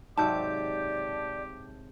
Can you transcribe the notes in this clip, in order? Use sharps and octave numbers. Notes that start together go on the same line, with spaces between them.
G#2 C3 F#3 G4 D5 A5 G6